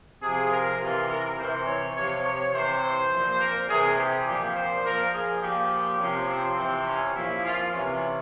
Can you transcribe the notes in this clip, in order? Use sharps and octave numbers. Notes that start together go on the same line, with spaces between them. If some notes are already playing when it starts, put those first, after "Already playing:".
C3 F3 G#4
A#4
C3 E3 F4
A#4
C3 E3 C5
C#5
C3 F3 C#5
C#5
C3 E3 C5
A#2 F3
A#4
C3 E3 G#4
G4
A#2 F3 G4
C5
A#2 F3 A#4
G#4
A#2 F3 G4
C3 F3 C#4
C4
C3 E3 C4
C#4
A#2 F3 E4
F4
C3 E3 C#4